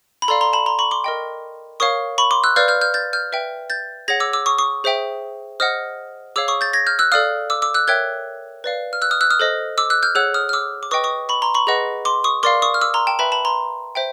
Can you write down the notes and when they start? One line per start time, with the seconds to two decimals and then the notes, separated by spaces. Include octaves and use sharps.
0.22 B5
0.28 A4 D5 F5 A#5 C6
0.41 A#5 C6
0.53 A5 B5
0.66 A#5 C6
0.79 B5 C#6
0.91 C6 D6
1.04 A#4 D#5 G5
1.80 A#4 C#5 F5 C#6 D#6
2.18 B5 C#6
2.31 C6 D6
2.44 E6 F#6
2.56 B4 D5 F5 F6 G6
2.68 F6 G6
2.81 F6 G6
2.94 G6 A6
3.13 F6 G6
3.32 B4 E5 G5
3.70 G6 A6
4.08 G#4 C#5 F#5 G#6 A#6
4.20 D6 E6
4.33 D6 E6
4.46 C#6 D#6
4.59 C#6 D#6
4.84 G#4 C5 E5 G5
5.60 C5 D#5 F#5 D#6 F6
6.36 G#4 C#5 F5 D6 E6
6.48 C#6 D#6
6.61 G6 A6
6.73 G#6 A#6
6.87 F6 G6
6.99 E6 F#6
7.12 A4 D5 F5 D#6 F6
7.50 D6 E6
7.62 D6 E6
7.74 E6 F#6
7.87 A#4 C#5 E5 G5 F#6 G#6
8.64 B4 D5 F5
8.93 F6
9.02 E6 F#6
9.11 D#6 F6
9.21 E6 F#6
9.31 D#6 F6
9.40 A4 C5 D#5
9.78 D6 E6
9.90 E6 F#6
10.03 F6 G6
10.15 G#4 C#5 F#5 E6 F#6
10.34 D#6 F6
10.49 F6
10.53 D6 E6
10.83 D6
10.91 B4 D#5 G5 C#6 D#6
11.04 C#6 D#6
11.29 B5 C#6
11.42 A#5 C6
11.54 B5 C#6
11.67 G#4 B4 D#5 F#5
12.05 C6 D6
12.24 C#6 D#6
12.43 A#4 D5 F5 C6 D6
12.62 C#6 D#6
12.74 F6
12.81 D6 E6
12.94 A#5 C6
13.07 G5 A5
13.19 B4 E5 G5 A5 B5
13.32 A5 B5
13.45 A#5 C6
13.95 C5 E5 G5